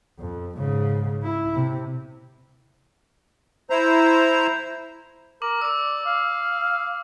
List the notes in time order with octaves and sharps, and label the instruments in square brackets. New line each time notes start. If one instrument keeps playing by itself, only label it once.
[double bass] F2
G#2 C#3
E4
C3
[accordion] E4 C5 A#5
[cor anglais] A#4 [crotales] D6 F#7
[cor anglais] D5 [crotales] D6 E6
[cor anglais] F5